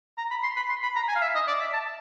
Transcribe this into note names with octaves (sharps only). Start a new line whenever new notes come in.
A#5
B5
C6
B5
C6
B5
A#5
G#5
F5
E5
D#5
D5
E5
A5